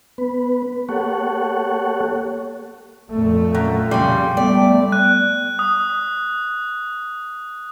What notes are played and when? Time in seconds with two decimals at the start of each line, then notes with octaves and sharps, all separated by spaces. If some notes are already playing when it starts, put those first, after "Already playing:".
0.18 B3 B4
0.89 A#3 G4 A4 C#5 F#5
3.12 F2 A#2 A3
3.54 F#2
3.91 C#3 G3 C6
4.37 G3 A3 B3 D5 G5
4.92 F#6
5.59 D#6